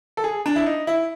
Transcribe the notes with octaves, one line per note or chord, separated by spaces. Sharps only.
A4
G#4
D4
E4
D#4
E4